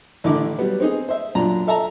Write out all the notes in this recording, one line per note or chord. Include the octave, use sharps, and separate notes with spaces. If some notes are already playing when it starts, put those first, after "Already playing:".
A1 D3 D#3 E4 D6
F#3 G3 B3
C4 D#4 G#4
C5 E5
F#2 A#2 D4 A#5
A4 E5 A5 A#5